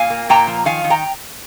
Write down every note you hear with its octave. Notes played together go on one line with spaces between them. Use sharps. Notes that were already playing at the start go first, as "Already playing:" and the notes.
Already playing: A#2 F5 G#5
A#3
A#2 G5 A#5
F3
D#3 F5 G#5
D#3
G5 A#5